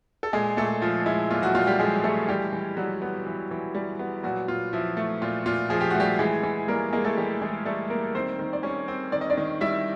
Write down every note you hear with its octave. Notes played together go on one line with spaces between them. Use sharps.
A4
A#2 G#3 G#4
A#2 A3 A4
F3 F4
G#3 E4
A#2 F4
F#3 F#4
A#2 F4
G3 G4
F3 G#3 G#4
G#3 A3 A4
E3 G3 G4
E3
F#3 G3 F#4
B3
E3
E3
G3
B3
A#2 F#3 F#4
A#2 F4
F3 E4
A3
A#2 F4
A#2 F4
F3 G#4
G4
A3 F#4
G3 G4
E3 G#3 G#4
E3
G3 A#3 A#4
G#3 A#3 G#4
A3 A4
E3 G3 G4
E3 G#3 G#4
G3 A3 A4
A#3 A#4
D#3 C4 C5
D#3
D5
G3 C#4 C#5
C4
D#3 D5
D#5
D4 D5
D#3
G3 E4 E5